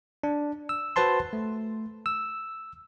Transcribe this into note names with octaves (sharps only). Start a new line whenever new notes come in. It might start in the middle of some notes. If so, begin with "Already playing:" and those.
D4
E6
F#4 B4 C5 A5 C6
A3
E6